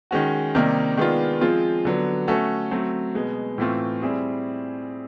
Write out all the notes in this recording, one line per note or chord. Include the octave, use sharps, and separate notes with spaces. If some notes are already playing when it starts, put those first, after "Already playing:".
D#3 G#3 C#4 F#4
C3 D#3 G3 A#3 D#4
D#3 G#3 B3 D4 F4
F3 G#3 C4 F4
D3 F#3 B3
A3 C#4 F#4 A4
F#3 A3 C4
B2 G#3 B3
A2 E3 A3 C4 F4
G3 C4 E4 G#4